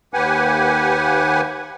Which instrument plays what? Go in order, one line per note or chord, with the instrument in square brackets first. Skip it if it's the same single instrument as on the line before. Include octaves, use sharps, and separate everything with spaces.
[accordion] D#2 G4 B4 F#5 G#5